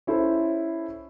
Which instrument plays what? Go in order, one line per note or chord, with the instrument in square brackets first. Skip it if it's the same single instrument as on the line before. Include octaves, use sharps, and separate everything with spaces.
[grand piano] C#4 E4 A4 C5